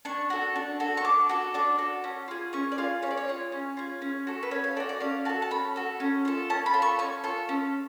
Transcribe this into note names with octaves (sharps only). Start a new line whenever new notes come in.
D4 C#6
F#4 A4
D4
F#4 A4
C#6
D4 D6
F#4 A4
D4 D6
F#4 A4
C#4
F4 G#4
C#4 C#6
D5
F4 G#4 F5
C#4 C#5
D5
C#5
F4 G#4
C#4
F4 G#4
C#4
F#4 A4
B4
C#4 C#5
F5
F#4 A4 D5
D5
C#4 F5
F#4 A4 A5
A5
C#4 B5
F#4 A4
C#4
F4 A4
C#4 A5
B5
F4 A4
C#6
C#4 C#6
F4 A4
C#4